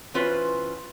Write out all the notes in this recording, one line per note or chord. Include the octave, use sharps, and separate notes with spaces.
E3 C#4 F4 F#4 B4 C5